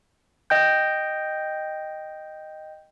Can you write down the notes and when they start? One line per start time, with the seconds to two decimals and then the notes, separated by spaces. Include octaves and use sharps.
0.50 D#5 G5 G6